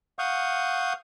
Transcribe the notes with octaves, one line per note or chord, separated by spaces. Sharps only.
F5 F#5 C#6 D#6 G6